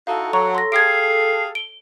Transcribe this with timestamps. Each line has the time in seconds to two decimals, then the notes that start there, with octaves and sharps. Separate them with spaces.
0.07 D#4 E4 F#4 A4 F5
0.33 F#3 C#5 A#5 C#6
0.55 C6 A#6
0.72 G4 G#4 F5 G#6 C7 D7
1.55 D7 G7